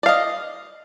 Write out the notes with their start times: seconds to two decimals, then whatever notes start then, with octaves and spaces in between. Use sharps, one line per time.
0.03 D5
0.06 F5
0.09 D#5